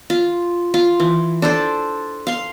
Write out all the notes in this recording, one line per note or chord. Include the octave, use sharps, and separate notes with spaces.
F4
F4
E3
D4 A4 C5
F5 C6